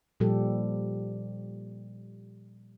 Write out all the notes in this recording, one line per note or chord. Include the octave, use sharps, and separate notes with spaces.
A#2 F3 G3 G4 A4